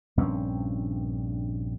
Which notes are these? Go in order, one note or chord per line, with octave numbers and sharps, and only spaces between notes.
A#1 G2 C4 C#4